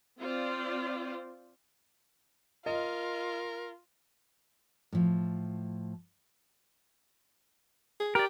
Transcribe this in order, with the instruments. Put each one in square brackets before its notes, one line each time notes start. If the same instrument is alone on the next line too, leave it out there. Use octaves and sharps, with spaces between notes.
[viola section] C4 F4 C5 D5
[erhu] F4 [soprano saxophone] A#4 [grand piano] D#5
[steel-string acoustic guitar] A2 F3
[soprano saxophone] G#4
[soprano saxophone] G4 [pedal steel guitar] A#4 D5